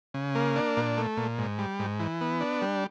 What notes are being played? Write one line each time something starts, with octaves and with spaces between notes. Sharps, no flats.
C#3
A#3
D4
A#2
A3
A#2
G#2
G3
G#2
E3
B3
D4
G3